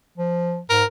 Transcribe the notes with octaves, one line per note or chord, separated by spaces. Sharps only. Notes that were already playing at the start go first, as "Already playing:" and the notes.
F3
G#2 A#4